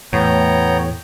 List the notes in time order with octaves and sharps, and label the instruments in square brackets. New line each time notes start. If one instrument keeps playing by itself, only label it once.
[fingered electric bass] E2 [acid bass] A2 [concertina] B3 C#5 A#5 [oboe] G5